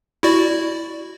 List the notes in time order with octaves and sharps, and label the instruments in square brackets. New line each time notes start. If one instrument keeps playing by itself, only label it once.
[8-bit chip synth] E4 F#4 D5